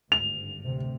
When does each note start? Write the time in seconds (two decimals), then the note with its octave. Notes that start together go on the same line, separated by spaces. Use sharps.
0.12 G#1 D2 G2 F7
0.64 A1 D2 C3